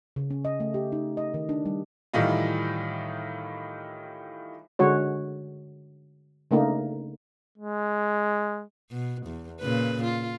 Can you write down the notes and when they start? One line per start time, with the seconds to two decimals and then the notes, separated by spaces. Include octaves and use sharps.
0.16 C#3
0.30 C#4
0.45 D#5
0.60 A3
0.74 G4
0.92 D#4
1.17 D#5
1.34 D#3
1.49 D4
1.65 G3
2.13 A2 D#3 E3 G3 D#4 F4
4.79 D3 G#3 D4 F#4 C#5
6.51 C#3 A3 A#3 D4 D#4
7.58 G#3
8.91 B2
9.27 E2
9.61 A#2 C#3 B4
10.04 F4